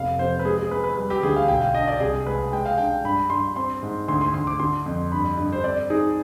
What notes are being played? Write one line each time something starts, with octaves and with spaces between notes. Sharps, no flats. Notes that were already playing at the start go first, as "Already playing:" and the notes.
Already playing: F1 B3 F5
F2 C5
B4
G#3 G#4
G#4
G#3 B4
B4
G3 B4
G4
D2 G#4
F5
B1 G5
F5
D4 D#5
D5
C2 G#4
G#3 B4
G#3 G5
F5
D4 G5
G2 B5
G2 C6
C4 C6
G#2
D2 C6
C6
D2 C6
D6
D3 C6
F2
G2 B5
G2
C5
C4 D5
D#4 G#4